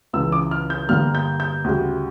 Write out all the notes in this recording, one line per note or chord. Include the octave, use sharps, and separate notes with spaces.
C#2 C#3 E3 E6
D6
F6
G6
G2 D3 G3 A#3 F6
G6
G6
D2 C#3 G3